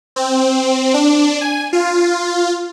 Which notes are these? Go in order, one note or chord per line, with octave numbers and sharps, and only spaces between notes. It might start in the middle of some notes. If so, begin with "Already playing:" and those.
C4
D4
G#5
F4